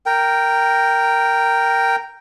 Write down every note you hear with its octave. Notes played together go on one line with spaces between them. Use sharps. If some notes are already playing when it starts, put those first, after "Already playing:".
A#4 G5